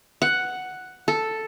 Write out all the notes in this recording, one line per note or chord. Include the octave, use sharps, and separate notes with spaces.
F#5
A4